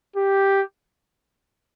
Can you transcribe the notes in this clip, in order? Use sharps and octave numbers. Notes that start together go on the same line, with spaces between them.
G4